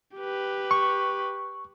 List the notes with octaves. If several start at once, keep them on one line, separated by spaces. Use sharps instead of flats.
G4 B4
C#6